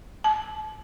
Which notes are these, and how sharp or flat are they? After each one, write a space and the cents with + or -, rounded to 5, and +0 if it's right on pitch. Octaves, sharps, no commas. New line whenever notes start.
A5 -35